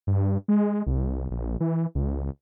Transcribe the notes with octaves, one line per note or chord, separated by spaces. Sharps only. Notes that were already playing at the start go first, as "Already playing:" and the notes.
G2
G#3
C2
A#1
E3
C#2